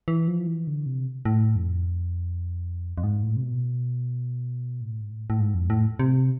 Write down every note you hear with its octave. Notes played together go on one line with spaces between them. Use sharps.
E3
F3
E3
D3
C3
A2
F2
F2
G#2
A2
C3
B2
A2
G#2
A2
A2
G#2
F2
A2
C3